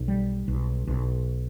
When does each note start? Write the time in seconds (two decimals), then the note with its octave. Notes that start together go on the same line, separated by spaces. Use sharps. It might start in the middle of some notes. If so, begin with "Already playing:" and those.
Already playing: B1
0.08 G3
0.48 B1
0.87 B1